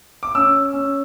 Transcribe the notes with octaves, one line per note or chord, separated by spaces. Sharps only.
D6
C#4 E6
C#4